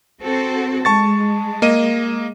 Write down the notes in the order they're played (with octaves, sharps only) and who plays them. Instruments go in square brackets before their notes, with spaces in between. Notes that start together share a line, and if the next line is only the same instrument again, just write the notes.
[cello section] C4 F#4 A4
[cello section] G#3 [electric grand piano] A5 C#6 A6
[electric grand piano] A#3 D#5 D#7